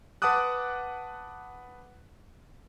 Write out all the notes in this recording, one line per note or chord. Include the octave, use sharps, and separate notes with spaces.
B4 F#5 A5 D6 D#6 F#6